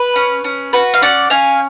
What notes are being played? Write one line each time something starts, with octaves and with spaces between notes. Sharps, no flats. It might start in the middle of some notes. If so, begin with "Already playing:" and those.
Already playing: B4
C#4
C#4
F#4 B4
F5
C#4 D5 F#5
C#4 F5 G#5